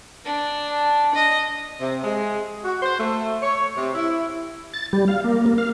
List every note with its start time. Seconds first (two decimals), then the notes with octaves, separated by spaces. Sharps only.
0.26 D4
1.15 D#5
1.80 C3
2.04 G#3
2.64 F#4
2.82 C5
2.99 A3
3.42 C#5
3.76 C3
3.95 E4
4.74 A6
4.93 G3
5.08 F5
5.24 A#3
5.46 A#3
5.58 F5